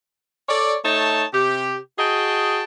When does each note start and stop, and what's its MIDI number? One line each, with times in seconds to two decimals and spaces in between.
0.48 0.75 69
0.48 0.75 73
0.48 0.75 74
0.84 1.25 57
0.84 1.25 63
0.84 1.25 73
0.84 1.25 81
1.32 1.77 48
1.32 1.77 67
1.98 2.64 66
1.98 2.64 68
1.98 2.64 75
1.98 2.64 79
1.98 2.64 81